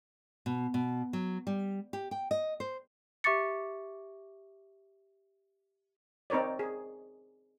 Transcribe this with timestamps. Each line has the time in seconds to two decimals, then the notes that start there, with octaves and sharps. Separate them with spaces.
0.46 B2
0.74 B2
1.13 F#3
1.47 G3
1.93 G4
2.11 G5
2.31 D#5
2.60 C5
3.24 G4 E5 C#6 D6 A6 C#7
6.30 C4 D#4 A#4 C#5 D5
6.59 G#4